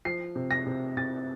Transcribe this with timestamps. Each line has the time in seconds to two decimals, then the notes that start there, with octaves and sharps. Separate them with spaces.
0.05 F3 C7
0.36 C3
0.51 A#6
0.67 C3
0.97 C3 A6